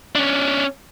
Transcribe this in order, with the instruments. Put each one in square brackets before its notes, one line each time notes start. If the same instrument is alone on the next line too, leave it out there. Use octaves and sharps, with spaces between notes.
[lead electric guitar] C#4 D4